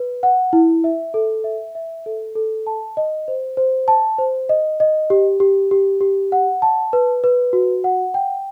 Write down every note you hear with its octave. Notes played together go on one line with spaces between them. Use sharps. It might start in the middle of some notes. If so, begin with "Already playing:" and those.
Already playing: B4
F#5
E4
E5
A4
E5
E5
A4
A4
A5
D#5
C5
C5
A5
C5
D#5
D#5
G4
G4
G4
G4
F#5
A5
B4
B4
F#4
F#5
G5